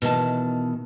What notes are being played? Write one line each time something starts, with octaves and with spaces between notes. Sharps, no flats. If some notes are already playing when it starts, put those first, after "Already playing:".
B2 D#3 E3 A5